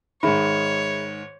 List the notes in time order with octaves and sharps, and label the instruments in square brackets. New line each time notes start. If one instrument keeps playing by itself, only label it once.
[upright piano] G#2 D#3 [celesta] G#4 E5 B5 [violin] C#5